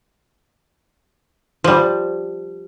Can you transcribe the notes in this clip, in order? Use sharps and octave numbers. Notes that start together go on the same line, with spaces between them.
F3 G3